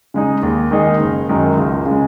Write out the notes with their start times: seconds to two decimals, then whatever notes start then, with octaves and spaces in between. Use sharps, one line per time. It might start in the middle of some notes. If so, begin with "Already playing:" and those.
0.14 C#3 G#3 D#4
0.43 D#2
0.71 D#3 G#3 D#4 G#4
0.99 F#1
1.29 F#2 D#3 G#3
1.57 C#2
1.86 C#3
1.91 G#3